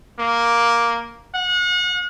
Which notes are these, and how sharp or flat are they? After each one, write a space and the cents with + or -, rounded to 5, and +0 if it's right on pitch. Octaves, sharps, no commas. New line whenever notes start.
A#3 +5
F#5 -35